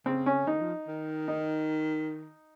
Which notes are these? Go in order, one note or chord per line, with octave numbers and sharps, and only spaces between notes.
C#3 C4
C#4
D#3 D#4
F3
D#3
D#4